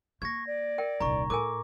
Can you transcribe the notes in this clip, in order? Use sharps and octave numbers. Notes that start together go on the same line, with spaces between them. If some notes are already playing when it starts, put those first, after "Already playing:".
A#3 C#6 G#6 A#6
D5
A#4 E5 G5
D#1 C2 A#5 C#6
A2 A4 A#4 G#5 D6